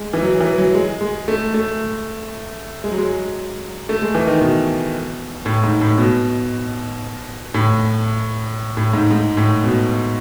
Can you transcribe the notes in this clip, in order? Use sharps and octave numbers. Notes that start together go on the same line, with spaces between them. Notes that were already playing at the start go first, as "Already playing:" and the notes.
Already playing: G#3
E3
F#3
E3
F#3
G#3
G#3
A3
A3
G#3
F#3
G#3
A3
G#3
E3
D#3
B2
A2
G#2
A2
B2
A2
A2
G#2
G#2
A2
B2